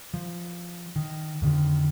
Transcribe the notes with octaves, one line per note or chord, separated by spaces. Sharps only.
F3
D#3
F2 D3 D#3